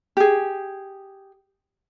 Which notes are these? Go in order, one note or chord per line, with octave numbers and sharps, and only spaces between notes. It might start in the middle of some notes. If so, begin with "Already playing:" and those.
G4 G#4